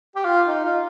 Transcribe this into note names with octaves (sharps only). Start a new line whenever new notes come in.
G4
F4
D#4
F4